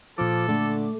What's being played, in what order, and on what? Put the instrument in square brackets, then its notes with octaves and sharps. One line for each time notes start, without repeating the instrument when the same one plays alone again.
[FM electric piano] A#2 D6 [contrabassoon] F3 [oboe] A4
[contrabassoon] D3 [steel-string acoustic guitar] A3